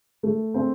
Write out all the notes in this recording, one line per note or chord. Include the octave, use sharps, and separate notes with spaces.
A3
C4